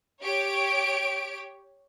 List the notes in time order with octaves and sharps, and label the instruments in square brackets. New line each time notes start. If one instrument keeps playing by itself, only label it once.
[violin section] G4 C#5 D7